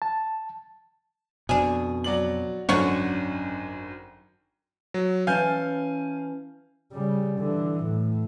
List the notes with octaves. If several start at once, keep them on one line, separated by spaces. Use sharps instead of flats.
A5
F2 B2 D4 G#4
F#3 D5 F#7
G#1 F#2 D3 C#4 C#5 F#5 C#6
F#3
E3 C#4 F5 G#5 A5 G6
C#3 G3
D3 E3
A2